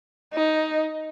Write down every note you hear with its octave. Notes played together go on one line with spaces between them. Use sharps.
D#4